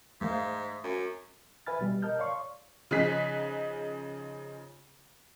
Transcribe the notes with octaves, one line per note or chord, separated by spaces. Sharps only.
G#2 A3 C5 F5
F#2
B4 E5 G#5 B5 F6 A6
B2 G3
A#4 D#5 A5 F6 G6
C#5 D5 F5 C6 C#6
C#3 F3 D#4 G#4 F#6 B6